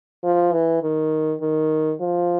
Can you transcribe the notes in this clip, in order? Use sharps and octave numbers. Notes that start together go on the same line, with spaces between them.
F3
E3
D#3
D#3
F3